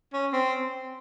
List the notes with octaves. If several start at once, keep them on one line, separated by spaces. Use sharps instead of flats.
C#4
C4